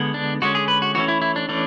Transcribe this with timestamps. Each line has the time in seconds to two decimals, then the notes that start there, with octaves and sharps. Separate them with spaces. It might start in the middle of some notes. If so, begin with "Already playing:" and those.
Already playing: D3 G#3 B3
0.14 D4
0.42 D3 G#3 C#4 F#4
0.55 G#4
0.68 B4
0.82 F#4
0.95 E3 A3 C#4 F#4
1.08 E4
1.22 E4
1.36 D4
1.49 E3 A3 C#4 D4